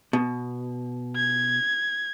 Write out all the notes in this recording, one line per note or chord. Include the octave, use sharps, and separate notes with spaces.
B2
G#6